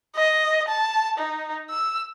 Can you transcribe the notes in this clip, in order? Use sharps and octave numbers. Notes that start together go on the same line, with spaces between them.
D#5
A5
D#4
E6